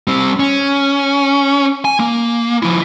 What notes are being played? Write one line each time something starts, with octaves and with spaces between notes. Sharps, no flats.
G3 C4
C#4
G#5
A#3
F3 E4